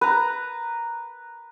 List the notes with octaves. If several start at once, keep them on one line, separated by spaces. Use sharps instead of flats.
B4 A#5